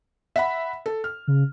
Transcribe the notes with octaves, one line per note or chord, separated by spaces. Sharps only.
E5 F#5 B5
A4
F6
C#3